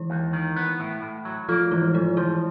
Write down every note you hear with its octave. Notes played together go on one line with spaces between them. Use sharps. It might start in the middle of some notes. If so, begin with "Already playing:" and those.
Already playing: E3 E4
D#2
D#3
B3
A2
A2
F#3
F3 A#3 F4
G#2 E3 E4
G#2 F3 F4
E3 F3 E4